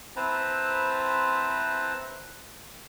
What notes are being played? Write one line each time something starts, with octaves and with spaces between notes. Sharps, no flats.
C4 E4 B4 C5 A5 A#5